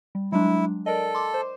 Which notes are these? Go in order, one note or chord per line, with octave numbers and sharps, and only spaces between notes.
G3
F#3 G#3 D4 E4
A4 A#4 D5 D#5
C6 D6
C5